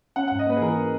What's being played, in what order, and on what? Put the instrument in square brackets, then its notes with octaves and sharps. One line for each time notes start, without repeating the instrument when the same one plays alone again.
[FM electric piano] C#4 [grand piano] F#5
[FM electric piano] G#2 [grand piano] F#5
[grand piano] D#5
[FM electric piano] A#3 [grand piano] B4
[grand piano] G#4
[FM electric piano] E3 [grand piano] A#4
[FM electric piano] C#4